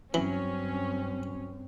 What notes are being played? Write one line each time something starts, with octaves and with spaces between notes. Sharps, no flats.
G2 E3 F#3 C4 C#4